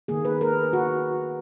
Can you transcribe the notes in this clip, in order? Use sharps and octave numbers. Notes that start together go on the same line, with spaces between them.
D#3 A#3 G#4
B4
A#4
F#4